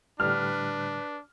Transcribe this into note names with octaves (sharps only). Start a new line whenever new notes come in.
A2 D3 G3 D4 B4 F6